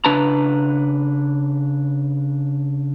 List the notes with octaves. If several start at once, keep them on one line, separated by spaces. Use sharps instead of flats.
C#3 D4 B4 A5 A#5